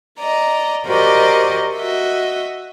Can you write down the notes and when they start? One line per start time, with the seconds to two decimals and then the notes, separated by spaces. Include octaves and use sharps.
0.18 D5 D#5 A#5
0.86 F#4 G4 A#4 C5 D5 D#5
1.77 F#4 D#5 E5